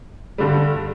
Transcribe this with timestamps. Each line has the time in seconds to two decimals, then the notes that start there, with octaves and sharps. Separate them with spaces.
0.38 G2 D3 G3